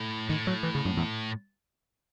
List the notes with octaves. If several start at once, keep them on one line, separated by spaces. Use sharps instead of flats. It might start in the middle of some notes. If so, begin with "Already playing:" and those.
Already playing: A2
A2 D#3
F#3
E3
C#3
F#2
E2